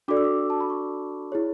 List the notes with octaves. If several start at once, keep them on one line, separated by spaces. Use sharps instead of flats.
D4 F#4 A4 D5 D6
E6
D6
A5
B5
C#6
E4 G#4 C#5